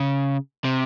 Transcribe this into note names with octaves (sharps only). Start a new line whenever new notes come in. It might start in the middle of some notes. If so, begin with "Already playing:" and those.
Already playing: C#3
C3